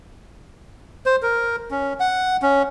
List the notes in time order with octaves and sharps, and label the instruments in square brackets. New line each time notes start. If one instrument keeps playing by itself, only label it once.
[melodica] C5
A#4
C#4
F#5
C#4